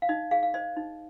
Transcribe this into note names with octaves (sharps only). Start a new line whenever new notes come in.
F5
D#4 D#5
G#4 F5
F5
C5 D#5
D#4